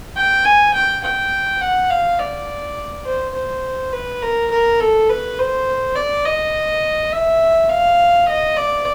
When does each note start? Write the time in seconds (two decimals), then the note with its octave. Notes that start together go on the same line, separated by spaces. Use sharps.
0.17 G5
0.45 G#5
0.74 G5
1.04 G5
1.61 F#5
1.90 F5
2.20 D5
3.06 C5
3.35 C5
3.93 B4
4.22 A#4
4.51 A#4
4.80 A4
5.10 B4
5.39 C5
5.95 D5
6.25 D#5
7.12 E5
7.69 F5
8.28 D#5
8.57 D5